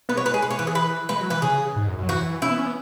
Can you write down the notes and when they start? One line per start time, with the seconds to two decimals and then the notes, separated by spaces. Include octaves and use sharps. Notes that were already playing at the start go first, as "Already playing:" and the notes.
0.09 B3 B4
0.16 G#3 C#5
0.21 B3
0.26 B4
0.31 G#3 G#4
0.42 B4
0.51 C#5
0.59 E3 B4
0.67 G#4
0.75 B4
1.09 G#3 B4
1.20 F#3
1.30 E3 B4
1.42 C#3 G#4
1.76 G#2
1.87 F#2
1.98 F#2
2.03 F#3
2.09 E3 F#4
2.42 C#4 E4
2.50 B3
2.58 C#4
2.66 B3